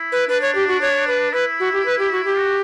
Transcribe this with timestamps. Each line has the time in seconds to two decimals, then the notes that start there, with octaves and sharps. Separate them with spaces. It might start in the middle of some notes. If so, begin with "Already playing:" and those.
Already playing: E4
0.12 B4
0.29 D4 B4
0.42 C#5
0.55 G4
0.68 F#4
0.81 C#5
1.08 B4
1.33 E4 B4
1.60 F#4
1.73 G4
1.86 B4
1.99 G4
2.12 F#4
2.25 G4
2.38 F#4